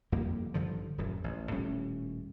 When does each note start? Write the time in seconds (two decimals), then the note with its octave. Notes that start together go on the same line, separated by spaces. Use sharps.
0.12 G1 F2 G3 A#3
0.54 A1 G2 D3 F3
0.98 D#1 F#2
1.24 A1
1.51 D#1 A2 G3 C#4